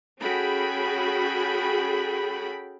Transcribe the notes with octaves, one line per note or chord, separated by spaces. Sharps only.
C#4 F#4 G#4 A4 G5 B5